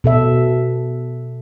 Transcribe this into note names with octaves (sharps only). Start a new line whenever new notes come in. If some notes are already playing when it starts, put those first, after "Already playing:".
B2 A4 E5